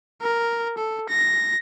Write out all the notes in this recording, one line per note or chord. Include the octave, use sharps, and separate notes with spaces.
A#4
A4
A#6